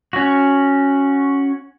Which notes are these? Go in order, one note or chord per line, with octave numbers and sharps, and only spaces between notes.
C#4 F#4